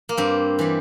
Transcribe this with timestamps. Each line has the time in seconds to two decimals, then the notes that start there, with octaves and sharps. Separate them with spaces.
0.09 A#3
0.17 G2 C4
0.59 E3 G3